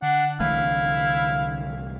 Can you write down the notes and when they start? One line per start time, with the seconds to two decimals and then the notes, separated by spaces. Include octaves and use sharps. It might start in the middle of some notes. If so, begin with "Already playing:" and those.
0.02 D3 D4 F#5
0.40 C2 E3 A3 E4 F5